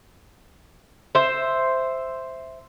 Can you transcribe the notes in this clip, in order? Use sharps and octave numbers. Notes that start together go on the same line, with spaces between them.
C5 E5